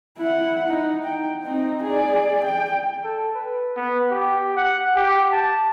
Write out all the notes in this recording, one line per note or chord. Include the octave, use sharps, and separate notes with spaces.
E4 F#5
D#4
G5
C4 D#4
G#4 D5
G5
A4
B4
B3
G4
F#5
G4
A5